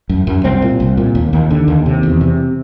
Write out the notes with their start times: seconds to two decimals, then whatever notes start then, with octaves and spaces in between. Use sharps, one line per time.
0.09 F#2
0.27 F#2
0.44 C2 C4
0.62 A#2
0.80 C2
0.97 A#2
1.15 D#2
1.33 D#2
1.51 D3
1.68 D#2
1.86 C3
2.03 E2
2.21 C3